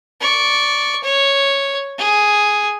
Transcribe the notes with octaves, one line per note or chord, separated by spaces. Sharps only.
D5 C#6
C#5
G#4